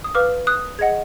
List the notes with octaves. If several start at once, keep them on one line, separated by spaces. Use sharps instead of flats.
D#6
B4 F5 D6 F6
D#6 F#6
G#4 D#5 F#5 G#6